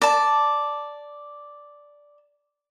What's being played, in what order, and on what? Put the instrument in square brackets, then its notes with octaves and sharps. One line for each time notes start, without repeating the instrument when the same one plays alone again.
[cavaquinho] D5 A5